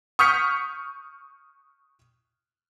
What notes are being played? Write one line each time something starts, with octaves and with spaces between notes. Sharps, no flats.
C#6 D#6 F6 G6 B6 C#7